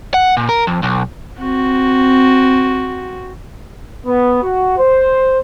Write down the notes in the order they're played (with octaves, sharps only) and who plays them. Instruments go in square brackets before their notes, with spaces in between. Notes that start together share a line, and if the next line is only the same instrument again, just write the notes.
[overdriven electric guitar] F#5
A#2
A#4
F2
B1
[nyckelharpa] C4 F#4
[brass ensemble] B3
F#4
C5